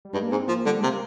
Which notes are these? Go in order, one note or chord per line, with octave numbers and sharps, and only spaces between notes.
G3
G2 G#3
A#3
G#2 C4
F3 A#3
D3 G3
G#3
C3 A#3